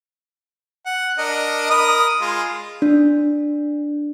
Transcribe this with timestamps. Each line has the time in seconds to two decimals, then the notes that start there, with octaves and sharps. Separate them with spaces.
0.86 F#5
1.18 D4 A#4 D#5
1.70 A#4 B5 D#6
2.21 G#3 F4
2.82 D4